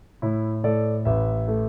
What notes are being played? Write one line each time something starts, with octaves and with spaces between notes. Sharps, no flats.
A2 E4
A2 A4 D5
A1 B4 E5
A3